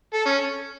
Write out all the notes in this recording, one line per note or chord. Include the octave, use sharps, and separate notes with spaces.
A4
C#4